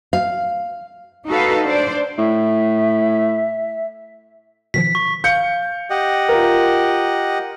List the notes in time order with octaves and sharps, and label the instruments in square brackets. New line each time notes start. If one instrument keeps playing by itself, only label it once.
[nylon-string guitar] F5
[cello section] D#4 F#4 A4 B4 F5
D4 C5 D5
[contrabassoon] A2 [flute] E5
[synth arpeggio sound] B2 D#3 F3 [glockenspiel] B6
[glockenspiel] C#6
[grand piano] F5 G6 C#7
[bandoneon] G4 D#5 F#5
[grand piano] F4 A#4